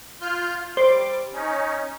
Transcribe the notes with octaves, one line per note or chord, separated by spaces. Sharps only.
F4 F6 G6
G3 C5 D6
C#4 D#4